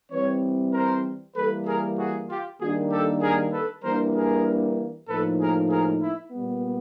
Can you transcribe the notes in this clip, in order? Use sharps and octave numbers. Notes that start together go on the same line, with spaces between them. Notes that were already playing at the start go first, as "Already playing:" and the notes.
E3 G3 C4 B4 C#5
A#4 C5
E3 G3 A#3 A4 B4
G#4 A#4
F#4 G#4
F4 G4
D#3 G3 A#3 D4 F#4 G#4
G4 A4
G#4 A#4
A4 B4
E3 G3 A#3 D4 A#4 C5
G#4 A#4
A2 F3 A#3 D#4 A4 B4
G#4 A#4
G#4 A#4
E4
A#2 G3 B3